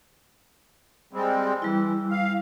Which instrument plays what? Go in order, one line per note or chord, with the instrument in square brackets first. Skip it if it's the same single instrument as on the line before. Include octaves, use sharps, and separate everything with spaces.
[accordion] G3 G#3 C4
[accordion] E3 [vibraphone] G3 E4
[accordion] F5